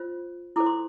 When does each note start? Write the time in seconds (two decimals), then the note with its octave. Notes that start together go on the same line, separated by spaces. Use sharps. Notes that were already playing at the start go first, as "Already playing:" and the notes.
Already playing: F4 C5
0.56 E4 A4 C5 D6
0.66 C6